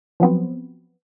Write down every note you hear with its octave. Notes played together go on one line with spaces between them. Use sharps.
F3 F#3 B3 C4